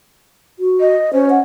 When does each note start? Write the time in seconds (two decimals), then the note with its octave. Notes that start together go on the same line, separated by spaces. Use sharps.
0.59 F#4
0.80 D#5
1.13 C#4 C5
1.30 F#5